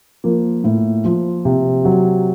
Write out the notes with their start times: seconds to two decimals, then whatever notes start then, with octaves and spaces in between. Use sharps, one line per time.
0.24 F3 A#3
0.64 A2
1.04 F3
1.45 C3
1.85 F#3